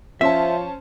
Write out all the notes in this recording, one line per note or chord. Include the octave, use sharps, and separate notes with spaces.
F3 C#4 C5 E5 A5